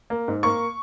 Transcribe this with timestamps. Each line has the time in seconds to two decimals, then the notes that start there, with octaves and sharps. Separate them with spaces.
0.10 A#3
0.28 G#2
0.43 A#3 C#6